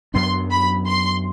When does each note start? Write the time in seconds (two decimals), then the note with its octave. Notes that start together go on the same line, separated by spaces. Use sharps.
0.14 F#2 F#3 B3 D4 C6
0.51 B5
0.87 C6